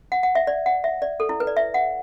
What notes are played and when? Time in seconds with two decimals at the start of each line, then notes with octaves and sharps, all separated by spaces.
0.12 F#5
0.23 F#5
0.35 E5
0.47 D5
0.66 F#5
0.84 E5
1.02 D5
1.20 A4
1.29 E4
1.40 B4
1.47 D5
1.57 E5
1.74 F#5